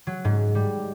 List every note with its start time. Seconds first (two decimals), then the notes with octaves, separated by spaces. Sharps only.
0.07 F#3
0.25 G#2
0.55 G3